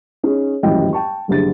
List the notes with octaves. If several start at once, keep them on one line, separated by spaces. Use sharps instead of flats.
C#4 D#4 G#4
D#1 A1 F#2 E4 D#5 G5
G5 A5 C#6
F#1 C2 D3 G#4 A6